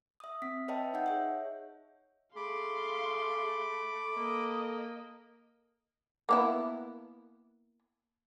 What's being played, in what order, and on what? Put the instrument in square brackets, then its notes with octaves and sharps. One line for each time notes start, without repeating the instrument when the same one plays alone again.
[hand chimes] E5 D#6
C4 B6
B4 C#5 D#5 E5 G5 A5
D#4 D#5 F#5 G6
G#4 C#5 E5
[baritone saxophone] A3 [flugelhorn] G#4 [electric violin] F5 C6 [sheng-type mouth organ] B5 D6
[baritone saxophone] A#3 [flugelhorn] A4 [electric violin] D#5
[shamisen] A#3 B3 E4